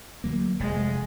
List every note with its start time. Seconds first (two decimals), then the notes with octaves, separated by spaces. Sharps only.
0.24 D2 F#3 A#3
0.60 F1 G#3